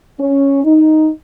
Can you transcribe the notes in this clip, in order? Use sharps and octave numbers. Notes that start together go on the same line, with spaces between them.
C#4
D#4